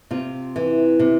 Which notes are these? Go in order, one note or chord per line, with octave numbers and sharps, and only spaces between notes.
C3 F4
E3
C3